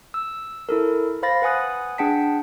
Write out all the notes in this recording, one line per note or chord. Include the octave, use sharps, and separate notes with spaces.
E6
E4 A4 A#4
C5 F5 B5 A6 A#6
B4 F#5 G#5 D#6 F#6
D4 G#4 F#5 G5 A5 B6